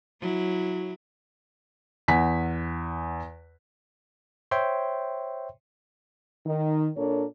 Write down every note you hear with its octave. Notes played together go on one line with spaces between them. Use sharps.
F#3 E4
E2 F#5 G#5 B6
C5 C#5 E5 G5 C6
D#3
A#2 D4 A4 A#4 C#5